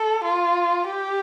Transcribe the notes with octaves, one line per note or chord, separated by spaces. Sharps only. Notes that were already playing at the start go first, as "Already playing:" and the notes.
Already playing: A4
F4
G4